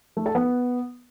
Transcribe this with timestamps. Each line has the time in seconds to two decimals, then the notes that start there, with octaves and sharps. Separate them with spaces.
0.17 A3
0.26 A4
0.35 B3